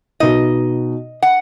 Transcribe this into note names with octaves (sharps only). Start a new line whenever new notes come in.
B2 D#4 D#5
F#5